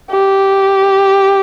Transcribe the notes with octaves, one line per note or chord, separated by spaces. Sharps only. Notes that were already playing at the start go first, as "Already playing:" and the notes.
G4